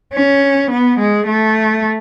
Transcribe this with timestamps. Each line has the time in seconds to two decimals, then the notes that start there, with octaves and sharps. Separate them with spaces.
0.14 C#4
0.70 B3
0.99 G#3
1.27 A3